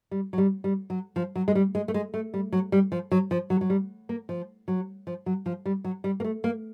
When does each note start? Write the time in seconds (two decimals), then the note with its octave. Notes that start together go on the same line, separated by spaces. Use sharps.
0.11 G3
0.33 F#3
0.38 G3
0.64 G3
0.90 F#3
1.16 F3
1.35 F#3
1.48 G#3
1.55 G3
1.75 G#3
1.88 A3
1.94 G#3
2.14 A3
2.34 G3
2.52 F#3
2.72 G3
2.92 F3
3.11 F#3
3.31 F3
3.50 F#3
3.61 F#3
3.70 G3
4.09 A#3
4.29 F3
4.68 F#3
5.07 F3
5.26 F#3
5.46 F3
5.66 G3
5.84 F#3
6.04 G3
6.20 A#3
6.24 A3
6.44 A#3